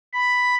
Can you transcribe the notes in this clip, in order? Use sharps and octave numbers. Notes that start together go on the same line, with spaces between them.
B5